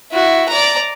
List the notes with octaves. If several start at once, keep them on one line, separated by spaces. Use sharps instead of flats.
E4 F#4
D5 A#5